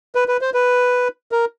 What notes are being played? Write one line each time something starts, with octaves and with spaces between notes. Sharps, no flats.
B4
B4
C5
B4
A#4